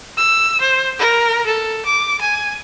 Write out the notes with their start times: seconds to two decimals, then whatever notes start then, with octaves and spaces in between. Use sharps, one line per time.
0.17 E6
0.61 C5
0.99 A#4
1.46 A4
1.85 D6
2.21 G#5